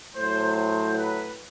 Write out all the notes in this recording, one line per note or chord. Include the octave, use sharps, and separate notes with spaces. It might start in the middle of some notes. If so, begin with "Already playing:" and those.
A2 F#3 C5
C5
B4